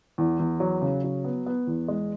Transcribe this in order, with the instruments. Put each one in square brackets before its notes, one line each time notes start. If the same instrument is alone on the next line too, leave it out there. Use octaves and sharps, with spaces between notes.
[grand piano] E2
E2
F#3
C#3
F#3
B3
B3
E2
G#3